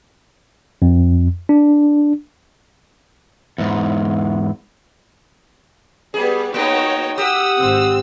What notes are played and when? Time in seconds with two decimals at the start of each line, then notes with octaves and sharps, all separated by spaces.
0.82 F2
1.49 D4
3.58 E2 G#2
6.14 G3 B3 G#4
6.54 A#3 B3 D#4 F#4 C#5 G5
7.18 G4 F#5 D#6 E6
7.57 G#1 C4 E6